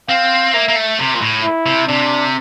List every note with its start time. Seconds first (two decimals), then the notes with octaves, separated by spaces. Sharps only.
0.09 C4 F5
0.54 A#3 E5
0.68 A#3
0.76 A3
0.99 C3
1.14 A#2
1.21 A2
1.43 E4
1.66 C3
1.88 C3 D4